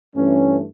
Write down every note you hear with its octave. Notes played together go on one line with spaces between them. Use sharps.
G2 E3 A3 C#4